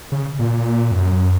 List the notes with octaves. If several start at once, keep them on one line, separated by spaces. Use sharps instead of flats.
C#3
A#2
F2
F#2